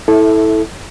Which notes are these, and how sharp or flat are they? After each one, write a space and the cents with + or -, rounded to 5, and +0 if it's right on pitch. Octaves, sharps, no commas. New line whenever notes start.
E4 -20 A4 -10 E5 +0